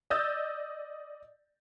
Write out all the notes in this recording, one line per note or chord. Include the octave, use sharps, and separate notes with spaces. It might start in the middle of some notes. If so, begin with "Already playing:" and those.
D5 D#5 D#6 E6 G6 A6